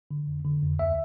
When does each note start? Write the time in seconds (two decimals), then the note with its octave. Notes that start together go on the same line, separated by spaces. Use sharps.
0.11 D3
0.27 F2
0.45 D3
0.62 F2
0.79 D2 E5